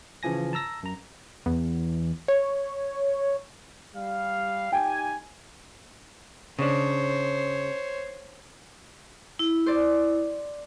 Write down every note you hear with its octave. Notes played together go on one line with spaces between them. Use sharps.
C#3 E3 F3 G#5 A#6
A5 A#5 E6 A#6
F#2 A#5
E2
C#5
G3 F5
D#4 G4 G5 G#5
C#3 D4 C5 C#5
E4
C5 D5